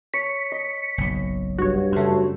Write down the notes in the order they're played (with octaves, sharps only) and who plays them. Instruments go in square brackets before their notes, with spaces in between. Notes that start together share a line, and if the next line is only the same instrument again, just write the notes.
[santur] C#5 [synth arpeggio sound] B6 C#7
[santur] D#5
[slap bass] F#1 B1
[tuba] G2 [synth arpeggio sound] F#4 C#5
[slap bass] F#2 C#3 [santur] A3 C5